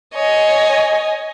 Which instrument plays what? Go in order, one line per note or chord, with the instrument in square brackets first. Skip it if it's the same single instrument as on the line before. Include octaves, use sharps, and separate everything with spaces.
[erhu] C#5 [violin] D#5 G#5